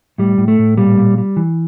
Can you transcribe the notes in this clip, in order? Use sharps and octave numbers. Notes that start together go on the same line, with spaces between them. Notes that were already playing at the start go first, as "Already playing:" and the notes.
A2 G3
A2
A3
A2
A#2 G3
A#2
G3
E3